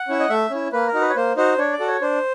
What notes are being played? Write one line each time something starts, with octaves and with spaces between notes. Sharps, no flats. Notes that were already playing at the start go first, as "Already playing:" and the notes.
Already playing: F#5
C#4 E4
D#5
A3 E5
C#4 E4
A#3 B4
A#4
D#4 F#4
B4
C#5
A#3 C5
D#4 F#4 C5
D4 C#5
D5
F#4 A4
C#5
D4 C5